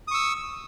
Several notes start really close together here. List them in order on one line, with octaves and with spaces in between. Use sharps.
D#6 C#6 E6